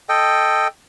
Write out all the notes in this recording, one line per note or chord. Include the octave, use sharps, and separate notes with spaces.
A4 D#5 G5